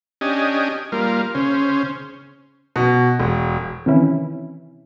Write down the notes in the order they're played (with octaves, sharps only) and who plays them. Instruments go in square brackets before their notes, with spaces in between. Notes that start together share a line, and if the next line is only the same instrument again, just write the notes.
[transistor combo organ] C#4 D4 G4 D#5 G#5
G3 A#3 F4 A#4
C#3 C#4 C5
[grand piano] B2
E1
[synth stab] C3 D#3 E3 C#4 E4